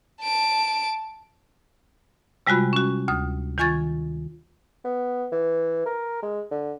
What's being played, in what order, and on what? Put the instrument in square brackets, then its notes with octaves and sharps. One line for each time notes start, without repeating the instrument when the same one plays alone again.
[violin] A5 D7
[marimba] C3 G3 G#3 F4 F#4 B5
C#4 F#4
D2 D#6
D#3 F4 G#5 C#6 G#6 A6
[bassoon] B3
E3
A#4
G#3
D3